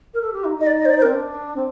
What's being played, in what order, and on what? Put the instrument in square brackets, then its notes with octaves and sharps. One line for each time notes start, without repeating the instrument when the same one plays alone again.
[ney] A#4
A4
G4
D#4
D#4
[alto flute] D#5
D5
D#5
C5
D5
C5
[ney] C4 [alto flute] A#4
[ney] D4
C4